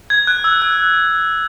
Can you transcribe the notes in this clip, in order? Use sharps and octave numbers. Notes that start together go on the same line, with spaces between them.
G#6
F#6
E6
F#6